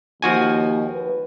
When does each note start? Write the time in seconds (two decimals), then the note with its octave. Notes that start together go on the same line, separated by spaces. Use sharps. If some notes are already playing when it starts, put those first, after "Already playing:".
0.22 D#2 F3 F#4 G#5
0.94 B4